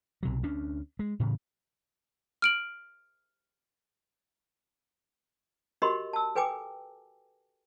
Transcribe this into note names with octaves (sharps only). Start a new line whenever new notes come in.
B1 C3 F#3
D2 C#4 D4
G#3
A2 C#3 E3
F6 D7 F#7
F#4 G4 A#4 D#5 B5 C6
A5 E6
A4 B4 G5 G#5 D6